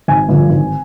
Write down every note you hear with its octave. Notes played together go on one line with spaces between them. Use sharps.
G#1 G#5
G2 D3 F3
G#1